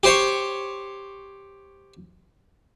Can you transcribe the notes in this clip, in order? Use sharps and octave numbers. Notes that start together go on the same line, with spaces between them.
G4 C5 C#5